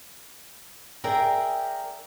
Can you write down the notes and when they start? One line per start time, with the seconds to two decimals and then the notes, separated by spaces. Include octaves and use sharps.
1.04 G#4 A#4 D5 E5 G5 A#5